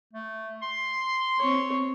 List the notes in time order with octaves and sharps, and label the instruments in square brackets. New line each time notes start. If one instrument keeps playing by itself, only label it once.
[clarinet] A3
C6
[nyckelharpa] C4 C#5